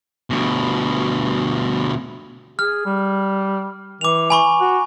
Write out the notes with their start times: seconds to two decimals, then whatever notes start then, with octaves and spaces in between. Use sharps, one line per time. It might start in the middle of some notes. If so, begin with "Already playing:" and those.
0.30 D2 B2
2.59 G#4 F6
2.86 G3
4.01 E3 D6 F7
4.30 G#5 B5 C#6
4.61 F#4